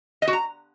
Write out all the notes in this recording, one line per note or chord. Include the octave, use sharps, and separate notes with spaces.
D#5
F#4
A#5